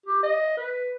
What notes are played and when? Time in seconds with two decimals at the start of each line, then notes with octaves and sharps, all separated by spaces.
0.06 G4
0.23 D#5
0.57 B4